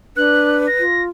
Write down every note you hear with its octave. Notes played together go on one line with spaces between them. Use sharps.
D4 B4 F#6
A#6
F4